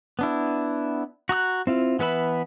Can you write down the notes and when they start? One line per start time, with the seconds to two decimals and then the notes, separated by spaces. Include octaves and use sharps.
0.19 B3 D4 E4
1.29 F#4 A#5 D#6 F#6
1.67 C4 E4 F4
1.99 E3 B3 B4 E5 B5